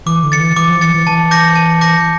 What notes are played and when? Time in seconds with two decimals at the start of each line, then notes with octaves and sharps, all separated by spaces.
0.06 E3 D6
0.23 D3
0.32 A6 C#7
0.40 E3
0.56 E3 D6
0.69 F3
0.81 E3 A6 C#7
0.94 E3
1.06 E3 A5
1.31 D6 G6 A#6 C#7
1.56 A5
1.81 D6 G6 A#6 C#7